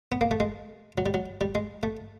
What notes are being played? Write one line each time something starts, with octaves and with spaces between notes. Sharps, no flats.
B3
A#3
A3
G#3
F#3
G3
F#3
G3
G#3
A3